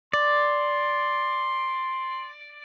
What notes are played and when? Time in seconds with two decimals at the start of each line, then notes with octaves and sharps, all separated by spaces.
0.13 D5 C6